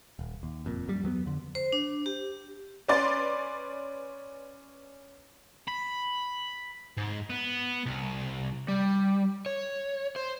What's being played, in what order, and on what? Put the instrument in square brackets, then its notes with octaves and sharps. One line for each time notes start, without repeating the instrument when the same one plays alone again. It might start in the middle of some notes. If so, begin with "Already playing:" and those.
[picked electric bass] D#1
D#2
F#1 F2 A#2
F#2 G3
E2 F#3 A#3 B3
F2 D3
[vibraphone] C5
D4
G4
[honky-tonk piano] C#4 B4 D5 C6 A6
[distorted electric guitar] B5
G#2
B3
C2
[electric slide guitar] G3
C#5
C5